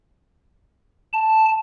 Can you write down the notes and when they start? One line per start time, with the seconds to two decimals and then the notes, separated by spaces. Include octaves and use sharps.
1.13 A5